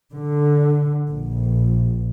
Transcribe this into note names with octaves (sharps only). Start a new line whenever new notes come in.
D3
A#1